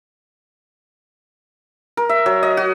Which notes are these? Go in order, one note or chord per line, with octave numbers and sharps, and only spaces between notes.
A#4
E5
F#3
D#5
F#4